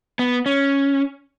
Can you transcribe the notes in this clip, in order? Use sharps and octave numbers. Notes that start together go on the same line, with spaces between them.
B3
C#4